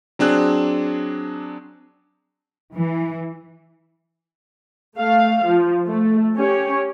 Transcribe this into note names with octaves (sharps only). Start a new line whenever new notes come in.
F#3 C4 D4 G#4 F#6
E3
A3 F5
F3
A3
C#4 G4 C#5